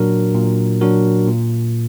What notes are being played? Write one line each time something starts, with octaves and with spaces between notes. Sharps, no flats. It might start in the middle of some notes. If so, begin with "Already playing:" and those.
Already playing: A#2 F#3 D4 F#4 A#4
A#2
F#3 D4 F#4 A#4
A#2